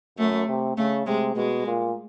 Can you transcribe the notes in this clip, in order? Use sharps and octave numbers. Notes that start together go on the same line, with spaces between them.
F#2 A3
C3
C#3 A3
C3 G#3
B2 G#3
A#2